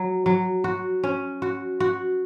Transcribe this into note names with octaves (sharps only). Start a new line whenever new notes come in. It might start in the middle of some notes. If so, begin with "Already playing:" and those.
Already playing: F#3
F#3
F#4
C#4
F#4
F#4